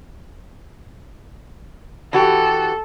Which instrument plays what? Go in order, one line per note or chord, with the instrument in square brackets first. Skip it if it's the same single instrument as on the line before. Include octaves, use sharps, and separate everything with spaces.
[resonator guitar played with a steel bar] E3 F#4 G4 [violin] A4